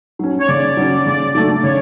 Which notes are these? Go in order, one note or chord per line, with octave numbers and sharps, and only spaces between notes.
F#3 C#4
C#5
C#3 D5
F#3 C#4
C#3
F#3 A3 D4
C#3 C#5